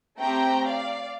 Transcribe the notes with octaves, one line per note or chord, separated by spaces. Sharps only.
A3 C4 G4 G5 A#5
D5 F5